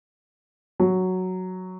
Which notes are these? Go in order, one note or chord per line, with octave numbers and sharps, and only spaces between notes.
F#3